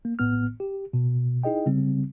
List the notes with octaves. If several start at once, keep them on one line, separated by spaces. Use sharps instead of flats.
A#3
A#1 A2 B3 F6
G4
B2
D#4 E4 G#4 D#5 G5
C#3 G3 C4